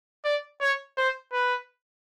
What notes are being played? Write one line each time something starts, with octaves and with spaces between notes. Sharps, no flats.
D5
C#5
C5
B4